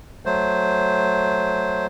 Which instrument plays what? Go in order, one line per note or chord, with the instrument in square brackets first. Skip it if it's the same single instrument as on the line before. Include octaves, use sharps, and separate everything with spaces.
[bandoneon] F#3 A3 C5